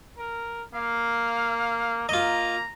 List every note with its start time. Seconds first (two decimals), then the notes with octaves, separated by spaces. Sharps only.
0.18 A#4
0.74 A#3 F5
2.09 A#3 F4 D#5 A#5